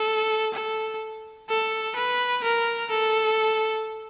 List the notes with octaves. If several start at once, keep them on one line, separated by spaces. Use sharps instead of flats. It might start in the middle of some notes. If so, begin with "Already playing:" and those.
Already playing: A4
A4
A4
B4
A#4
A4